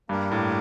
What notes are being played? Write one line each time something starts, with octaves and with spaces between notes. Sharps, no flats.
G2 A#3 D4 G4 A#4
A2